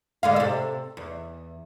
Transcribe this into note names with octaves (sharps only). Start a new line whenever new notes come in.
D3 G#3 F5
C3 A4
E2